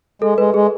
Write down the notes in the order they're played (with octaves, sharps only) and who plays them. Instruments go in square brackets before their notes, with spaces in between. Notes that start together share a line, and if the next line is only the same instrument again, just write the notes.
[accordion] G#3 [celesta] A4
[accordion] G#3 [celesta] B4
[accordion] G#3 [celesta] G#4